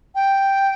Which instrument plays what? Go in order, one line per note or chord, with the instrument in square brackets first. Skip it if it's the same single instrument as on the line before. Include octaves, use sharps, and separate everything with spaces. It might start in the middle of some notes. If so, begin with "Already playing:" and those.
[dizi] G5